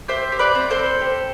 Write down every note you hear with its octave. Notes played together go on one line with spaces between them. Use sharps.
G4 C5 E5
G4
B4 D5
C4
A4 C5
C4
G4